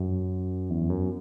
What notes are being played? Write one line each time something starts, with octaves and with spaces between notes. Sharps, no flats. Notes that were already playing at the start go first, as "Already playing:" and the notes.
Already playing: F#2
E2
F#2